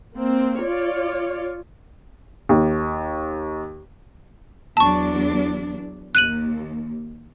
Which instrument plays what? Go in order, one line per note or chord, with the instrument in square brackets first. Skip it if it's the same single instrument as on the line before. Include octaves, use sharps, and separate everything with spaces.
[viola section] A#3 C4
F4 C#5 D5
[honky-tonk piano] D#2
[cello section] E2 F#3 D4 [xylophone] A5 C#6
[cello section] D#2 [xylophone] F#6 D#7 F#7